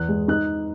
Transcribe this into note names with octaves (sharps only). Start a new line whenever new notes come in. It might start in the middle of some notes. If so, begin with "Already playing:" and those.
Already playing: E2 F#6
G#3
D#4 F#6